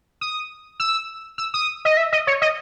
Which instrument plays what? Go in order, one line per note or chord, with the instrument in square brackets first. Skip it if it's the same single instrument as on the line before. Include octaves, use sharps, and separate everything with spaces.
[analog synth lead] D#6
E6
E6
D#6
D#5
E5
D#5
C#5
D#5